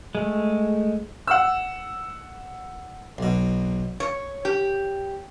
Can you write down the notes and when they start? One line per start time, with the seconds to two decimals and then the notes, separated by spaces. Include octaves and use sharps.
0.15 G#3 A3
1.27 F#5 E6
3.18 B1 B2
4.00 C#5
4.45 G4